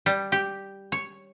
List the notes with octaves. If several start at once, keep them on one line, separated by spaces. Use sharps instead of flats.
G3
G4
C#5